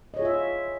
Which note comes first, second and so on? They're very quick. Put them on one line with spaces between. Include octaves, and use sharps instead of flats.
D#5 C#5 G#4 F4 E5